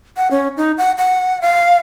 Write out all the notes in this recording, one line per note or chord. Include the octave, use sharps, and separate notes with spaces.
F#5
C#4
D#4
F#5
F#5
F5